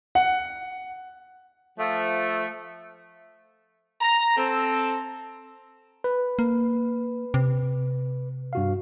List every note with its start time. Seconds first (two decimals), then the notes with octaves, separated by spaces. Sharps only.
0.15 F#5
1.79 F3 A3
4.01 A#5
4.37 C4 A4
6.04 B4
6.39 A#3
7.34 C3
8.53 G2 F#4 F5